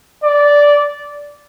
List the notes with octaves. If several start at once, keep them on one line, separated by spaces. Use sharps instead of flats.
D5